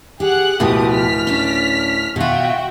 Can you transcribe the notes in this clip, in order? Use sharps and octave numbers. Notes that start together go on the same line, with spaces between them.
G4 G#4 F#5 F#6
D1 B2 F3 G4 D#6
F6 B6
C#4 D4
B2 F4 F#4 E5 G5